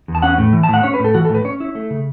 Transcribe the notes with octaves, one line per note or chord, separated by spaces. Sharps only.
E2
A5
C#4 F#5
A2
E3
A5
A2 F#5
C#4 C#5
B4
A2 A4
E3 F#4
A4
A2
B4
C#4 C#5
E4
A3
C#3